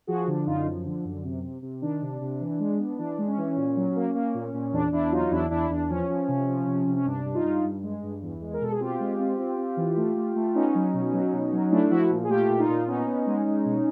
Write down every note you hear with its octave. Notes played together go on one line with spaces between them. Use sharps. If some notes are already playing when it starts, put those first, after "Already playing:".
F3 F#4 G#4
D3 D4
F#2 D#4 F4
F3
D3
F#2
C3
C3
C3
D#3 D4
C3
C3
E3
G#3
B3
E3 D4
G#3
C#4
E3
A#2
F#3
A#3
A#3
A#2
A#2
E2 D4
E2 D4 E4
F#3 D#4 F4
E2 D4 E4
E2 D4 E4
E2 D4
F3 C#4
F3
C3
F3
C3
C3
C#4
G2 D4
G2
D#4 F4
G2
G2
G#3
G2
E2
G#3
A#4
B2 A4
G#4
C4 F4 G4
G#3
C4
C4
C4
E3
A3
A3
A3
B3 C#4 D#4
F#3
B2
F#3
B2
F#3
A3 D4 E4
F3 E4 F#4
A#2
G#4
A3 F4 G4
A#2
D#4 F4
A#2
B3 C#4 D#4
B3
G#3
G#3
B2